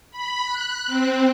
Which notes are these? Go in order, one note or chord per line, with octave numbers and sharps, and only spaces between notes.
B5
F#6
C4